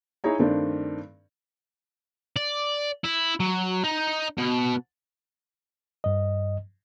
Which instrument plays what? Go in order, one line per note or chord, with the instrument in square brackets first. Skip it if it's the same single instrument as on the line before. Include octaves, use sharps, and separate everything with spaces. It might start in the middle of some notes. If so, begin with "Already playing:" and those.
[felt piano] D#4 E4 G#4 C#5 A#5
G2 D#3 A3 C4 D4
[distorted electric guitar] D5
E4
F#3
D#4
B2
[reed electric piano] G2 D#5